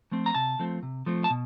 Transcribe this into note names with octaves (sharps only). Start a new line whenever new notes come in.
F3 A3 C4
A#5
C3 A5
F3 A3 C4
C3
F3 A3 C4
A5
B2